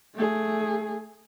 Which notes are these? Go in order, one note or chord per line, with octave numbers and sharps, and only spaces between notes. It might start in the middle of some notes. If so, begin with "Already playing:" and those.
A3 G#4